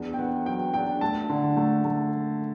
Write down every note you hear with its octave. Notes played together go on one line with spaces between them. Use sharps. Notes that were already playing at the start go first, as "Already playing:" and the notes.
Already playing: E2 D4
G5
B3 F#5
F#3 G5
D4 G5
A3 A5
D3
A3
A3